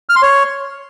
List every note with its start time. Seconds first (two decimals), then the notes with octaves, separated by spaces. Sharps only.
0.09 F6
0.16 C6
0.22 C#5